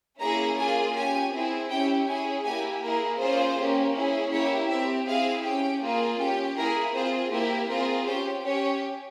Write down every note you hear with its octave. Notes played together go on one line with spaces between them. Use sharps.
A#3 C#4 E4 G#4 A#5
A#3 F4 G#4 G#5
C#4 G4 G#5
C4 E4 G#4
C#4 E4 G4 G5
C#4 E4 G#4 G#5
A#3 E4 G4 G#5
A#3 E4 G#4 A#4
A#3 C#4 F4 G#4 C5
A#3 C#4 G4
C#4 E4 G#4
A#3 E4 G4 C#5
C4 G4 E5
C4 E4 G#4 F5
C#4 G4 G5
A#3 F4 G#4
C#4 G4 G5
A#3 E4 G#4 A#4
C4 F4 G#4 C5
A#3 E4 G4 A#4
C4 F4 G#4 A#4
C#4 G4 C5
C#4 G4 C#5